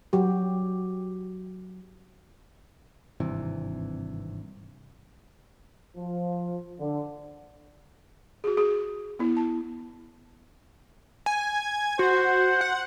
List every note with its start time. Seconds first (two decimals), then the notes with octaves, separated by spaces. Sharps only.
0.13 F#3 F#4 G4
3.20 G#1 G2 C3 E3
5.97 F3
6.80 D3
8.44 F#4 G#4
8.57 G#4
9.19 B3 E4
9.37 A5
11.26 G#5
11.99 F#4 C5
12.61 F#5